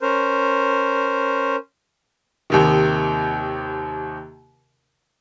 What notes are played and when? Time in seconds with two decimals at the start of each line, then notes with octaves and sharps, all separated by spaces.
0.01 C#4 A#4 C5
2.50 D#2 C3 D#3